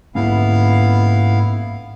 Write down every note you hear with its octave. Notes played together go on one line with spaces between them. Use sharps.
G#2 A#3 B3 C#4 E4 F5